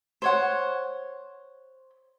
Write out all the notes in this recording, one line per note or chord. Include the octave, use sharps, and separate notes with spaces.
C5 C#5 F#5